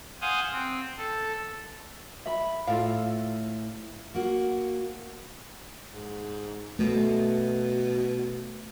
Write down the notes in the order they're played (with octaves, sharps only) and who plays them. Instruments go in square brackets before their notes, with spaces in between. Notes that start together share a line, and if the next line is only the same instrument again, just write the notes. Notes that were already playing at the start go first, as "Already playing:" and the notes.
[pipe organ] C5 F5 F#5 G#5 D#6
C4
A4
[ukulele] E5 B5
[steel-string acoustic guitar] A2 [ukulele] F4 A4 F5
[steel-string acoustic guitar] A#3 F#4
[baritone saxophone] G#2
[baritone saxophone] B2 [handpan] A3